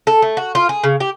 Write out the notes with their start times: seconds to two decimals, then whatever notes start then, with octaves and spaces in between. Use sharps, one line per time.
0.07 A4
0.22 A3
0.37 F#4
0.55 F4
0.69 G#4
0.83 C#3
1.00 G4